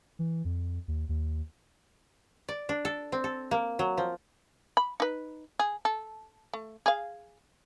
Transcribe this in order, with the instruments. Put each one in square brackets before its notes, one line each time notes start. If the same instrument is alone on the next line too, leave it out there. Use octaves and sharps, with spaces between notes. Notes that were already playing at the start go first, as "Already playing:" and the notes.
[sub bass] E3
F2
D#2
D#2
[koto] D5
D4
A4
C4
A4
A#3
F#3
F3
[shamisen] B5
D#4 B4
G#4
A4
A3
G#4 F5